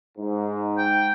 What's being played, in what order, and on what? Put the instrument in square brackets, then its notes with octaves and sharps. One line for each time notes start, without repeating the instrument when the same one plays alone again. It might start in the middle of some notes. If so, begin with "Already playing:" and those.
[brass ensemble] G#2
[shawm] G5